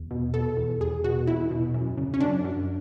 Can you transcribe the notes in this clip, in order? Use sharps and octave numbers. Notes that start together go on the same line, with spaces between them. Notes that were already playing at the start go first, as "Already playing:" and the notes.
Already playing: E2
B2
B2 A4
E2
E2 G#4
B2 F#4
E2 E4
B2
F#2
C#3
C#4
F#2 D4
F#2